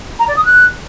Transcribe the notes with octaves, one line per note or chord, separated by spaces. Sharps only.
A#5
D5
D#6
F#6